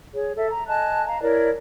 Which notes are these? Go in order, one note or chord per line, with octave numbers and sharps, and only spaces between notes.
G#4 C#5
A4 E5
A#5
D#5 G#5 A5 F#6
F5 A#5
E4 A#4 C#5 D5